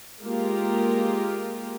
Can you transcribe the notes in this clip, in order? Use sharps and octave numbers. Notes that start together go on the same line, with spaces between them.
G#3 A#3 F4 G4 A#4